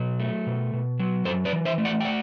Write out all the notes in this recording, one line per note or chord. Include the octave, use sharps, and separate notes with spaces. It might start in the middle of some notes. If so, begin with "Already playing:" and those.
Already playing: B2 F#3
A3
B2
B2
F#3
F#2 A4 C5
B4 D5
E3
C5 E5
A3
D5 F#5
G5
D5 F#5